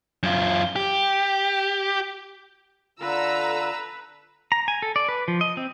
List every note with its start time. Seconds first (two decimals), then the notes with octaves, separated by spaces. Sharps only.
0.23 F#2 F4
0.76 G4
3.00 D3 F4 A4 B4 A#5 E6
4.52 A#5
4.68 G#5
4.82 A4
4.96 D5
5.09 B4
5.28 F3
5.41 D#5
5.57 C4